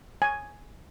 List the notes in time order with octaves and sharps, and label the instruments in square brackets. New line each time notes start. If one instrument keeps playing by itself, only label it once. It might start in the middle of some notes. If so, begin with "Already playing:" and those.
[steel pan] G#5